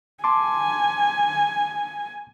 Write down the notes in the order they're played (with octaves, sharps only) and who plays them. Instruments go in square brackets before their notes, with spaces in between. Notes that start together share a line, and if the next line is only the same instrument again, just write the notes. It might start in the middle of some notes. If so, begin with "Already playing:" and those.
[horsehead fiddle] G#5 [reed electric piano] A5 C6 D6